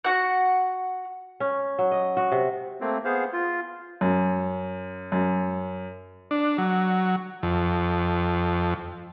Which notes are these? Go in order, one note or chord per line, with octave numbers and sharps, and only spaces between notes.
F#4 F#5
C#4
F#3
D#5
F#4
C3
A3 A#3 C4
B3 G#4 C5 F5
F4
F#2
F#2
D4
F#3
F2